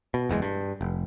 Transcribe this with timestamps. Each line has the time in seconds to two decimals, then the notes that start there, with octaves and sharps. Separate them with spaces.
0.14 B2
0.29 F#1 E2 A#2 G#3
0.42 G2
0.81 F1